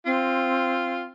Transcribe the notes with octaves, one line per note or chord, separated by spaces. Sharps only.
C4 F4